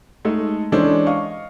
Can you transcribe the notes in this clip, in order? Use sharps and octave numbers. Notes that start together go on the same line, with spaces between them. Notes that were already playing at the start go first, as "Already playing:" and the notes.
G#3 A3 D#4 A4
E3 G#3 C#4 D4 A4 C5
D#5 F5 C#6